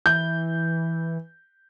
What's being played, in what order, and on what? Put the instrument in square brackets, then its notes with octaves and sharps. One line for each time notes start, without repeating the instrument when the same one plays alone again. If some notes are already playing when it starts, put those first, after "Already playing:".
[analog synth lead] E3 [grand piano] G6